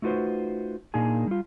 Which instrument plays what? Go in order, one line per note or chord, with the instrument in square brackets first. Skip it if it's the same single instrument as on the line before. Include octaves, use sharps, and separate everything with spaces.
[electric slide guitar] A3 D#4 F4 F#4 B4 C5
A#2 A#3 D4 D#4 G#4 G#5
G3 F4